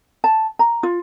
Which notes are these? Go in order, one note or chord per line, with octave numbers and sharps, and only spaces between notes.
A5
A#5
F4